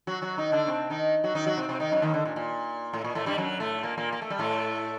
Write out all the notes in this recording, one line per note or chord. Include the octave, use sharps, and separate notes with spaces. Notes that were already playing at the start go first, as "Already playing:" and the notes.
F#3 F#4
F#3 F#4
D#3 D#4
D3 D4
C3 C4
D#3 D#4
F#3 F#4
D#3 D#4
F#3 F#4
C3 C4
C3 C4
D#3 D#4
F#2 F#3
D#2 D#3
D3
A#2
A#2
A2
A#2
A2 A3
G2 G3
F#2 F#3
A2 A3
A#2 A#3
A#2 A#3
A#3
A3
G3
A2 A3